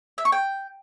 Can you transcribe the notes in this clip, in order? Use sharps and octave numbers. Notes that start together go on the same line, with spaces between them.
E5
C#6
G5